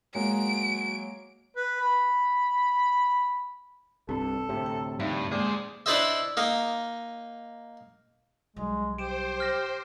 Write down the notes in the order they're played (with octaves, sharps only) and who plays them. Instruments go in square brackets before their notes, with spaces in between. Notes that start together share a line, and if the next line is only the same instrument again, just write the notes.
[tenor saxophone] F#3 [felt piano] G#3 A#3 [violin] D7
[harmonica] B4
B5
[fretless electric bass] C2 G2 [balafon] C4 E4 [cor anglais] A4
[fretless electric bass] D2 A2 C3
[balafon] A#5
[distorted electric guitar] G2 [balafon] D#4 E5 F5
[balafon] G#3 A#3 C#4 [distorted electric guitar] G#4 C5 [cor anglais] D5
[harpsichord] D4 E4 B4 C5 D#5 E5
A#3 D#4 D#5
[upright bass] B1 G3 [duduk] G#3
[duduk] G4 [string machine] C5 [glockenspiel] D7 E7
[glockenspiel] F6 A#6